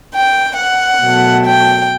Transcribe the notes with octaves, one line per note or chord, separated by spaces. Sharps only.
G5
F#5
B2 F#3 A3
G5